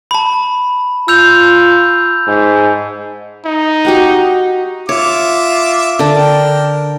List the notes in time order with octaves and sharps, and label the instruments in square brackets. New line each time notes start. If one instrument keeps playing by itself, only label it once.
[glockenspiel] A5 B5
[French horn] F4 [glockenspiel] E6 G6 F7
[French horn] G#2
[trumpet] D#4
[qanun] F#4 G4 F#5
[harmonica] F4 E5 D6 [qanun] C#5
[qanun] D3 D4
[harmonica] A#4 G5